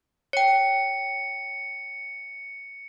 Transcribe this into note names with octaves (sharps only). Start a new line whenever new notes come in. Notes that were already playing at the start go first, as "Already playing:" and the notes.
C#5 G5 C#7